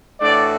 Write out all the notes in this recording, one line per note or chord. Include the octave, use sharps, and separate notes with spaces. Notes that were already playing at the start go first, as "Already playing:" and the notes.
A2 E3 A3 D4 F#4 D5